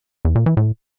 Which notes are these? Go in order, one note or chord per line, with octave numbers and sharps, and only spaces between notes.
E2
A#2
E3
A2